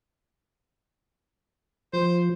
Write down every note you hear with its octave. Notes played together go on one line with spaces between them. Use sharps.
F3 C5